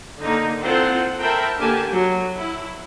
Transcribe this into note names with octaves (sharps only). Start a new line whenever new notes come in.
D3 A#3 D#4
C4 E4 F4 A4 C5 F#5
A#4 C5 E5 G5 A5 B5
D3 A#3 G4 G#5 A5
F#3
E4